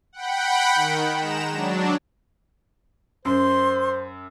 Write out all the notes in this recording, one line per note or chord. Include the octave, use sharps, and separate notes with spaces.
F#5 G5 B5
D#3
G#3 A#5 E7
F#3 D4
F#2 C5 C6